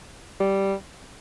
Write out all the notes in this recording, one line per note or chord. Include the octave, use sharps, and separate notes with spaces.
G3